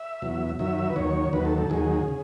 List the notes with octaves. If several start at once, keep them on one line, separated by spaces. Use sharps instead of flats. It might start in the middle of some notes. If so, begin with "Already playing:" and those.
Already playing: E5
E2 B2 F#3
F#2 D#3 F#3 E5
B4
D#2 D#3 F#3 C#5
D#2 D#3 F#3 B4
A4
A4
D#2 D#3 F#3 G#4
C#3